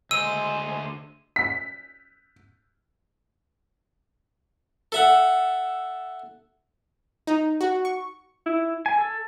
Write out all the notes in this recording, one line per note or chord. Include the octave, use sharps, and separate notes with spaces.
D2 G#3 C5 E6 D#7
B6
A4 E5 F#5
D#4
F#4
C#6
E4
G#5
A4